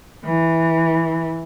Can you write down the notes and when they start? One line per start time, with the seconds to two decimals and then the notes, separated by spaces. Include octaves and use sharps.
0.25 E3